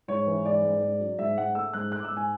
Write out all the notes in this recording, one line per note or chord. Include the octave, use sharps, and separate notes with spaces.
G#2 C#5
E3
G#2 D5
G#2
G#2
F#3
G#2 E5
G#2 F#5
A3 E6
G#2 F#6
A3 F#6
D6
E6
G#2
G#5